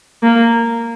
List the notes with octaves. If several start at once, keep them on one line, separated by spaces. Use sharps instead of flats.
A#3